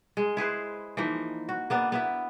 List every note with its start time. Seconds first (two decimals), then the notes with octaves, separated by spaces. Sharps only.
0.17 G#3
0.37 E4 G#4 B4 C5
0.97 E3 F3 A#3 D#4
1.49 F#4
1.70 A#3 B3 D4
1.92 B3 E4 E5